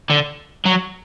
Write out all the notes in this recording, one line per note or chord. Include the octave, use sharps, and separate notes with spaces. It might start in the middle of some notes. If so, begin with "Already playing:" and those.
D3
F#3